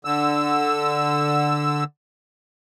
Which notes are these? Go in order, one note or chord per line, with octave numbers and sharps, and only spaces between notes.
D3 E6